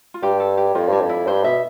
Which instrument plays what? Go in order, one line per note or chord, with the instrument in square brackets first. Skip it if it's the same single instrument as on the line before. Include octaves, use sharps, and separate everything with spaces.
[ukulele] F4
[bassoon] G2 [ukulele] G4
[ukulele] A4
G4
[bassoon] F2 [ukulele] F4
[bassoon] G2 [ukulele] D4
[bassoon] F2
[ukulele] E4
[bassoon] G2 [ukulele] C5
[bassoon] B2 [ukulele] E5